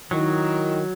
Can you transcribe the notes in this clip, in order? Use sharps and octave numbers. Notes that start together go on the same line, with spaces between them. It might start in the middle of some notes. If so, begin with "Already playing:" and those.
D#3 F#3 E4